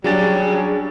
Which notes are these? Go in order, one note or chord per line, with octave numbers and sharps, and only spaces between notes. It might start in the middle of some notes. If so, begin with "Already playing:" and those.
C#3 F#3 G3 D4 G#4 A6